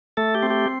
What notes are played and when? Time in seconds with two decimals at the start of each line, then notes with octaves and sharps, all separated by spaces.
0.17 A3 A4
0.35 G4
0.43 C4
0.50 G4